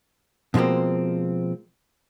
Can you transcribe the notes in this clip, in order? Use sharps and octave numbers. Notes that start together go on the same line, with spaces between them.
B2 F3 G#3 A#3 C4